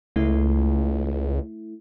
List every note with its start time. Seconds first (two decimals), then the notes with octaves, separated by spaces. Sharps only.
0.16 C#2 A3 E4